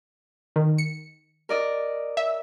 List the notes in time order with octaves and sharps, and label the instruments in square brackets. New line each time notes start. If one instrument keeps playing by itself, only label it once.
[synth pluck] D#3
C#7
[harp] A#4 D5 D#5
[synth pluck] E5